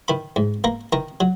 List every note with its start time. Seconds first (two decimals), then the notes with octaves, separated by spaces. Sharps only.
0.08 D#3 B5
0.36 G#2
0.64 A#3 A#5
0.93 D#3 A#5
1.20 F#3